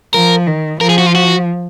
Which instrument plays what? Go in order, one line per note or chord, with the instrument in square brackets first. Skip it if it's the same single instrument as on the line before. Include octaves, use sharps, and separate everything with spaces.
[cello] F3 [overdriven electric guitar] A#4
[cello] D#3
[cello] F3 [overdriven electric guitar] A#4
[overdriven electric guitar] G#4
F#4
F4
F#4